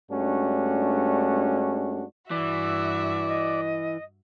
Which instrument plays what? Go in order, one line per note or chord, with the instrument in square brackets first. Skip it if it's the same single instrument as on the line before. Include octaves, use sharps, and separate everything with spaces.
[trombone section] G2 G#3 A3 C#4 D4 F#4
[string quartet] G2 F#4 E5 [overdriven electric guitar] E3 [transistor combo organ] D5
[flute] D#5